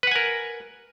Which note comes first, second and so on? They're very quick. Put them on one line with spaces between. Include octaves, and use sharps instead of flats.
B4 F#5 G#5 A#4